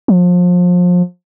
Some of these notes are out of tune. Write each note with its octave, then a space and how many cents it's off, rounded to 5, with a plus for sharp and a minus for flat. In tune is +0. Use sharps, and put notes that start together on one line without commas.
F3 +30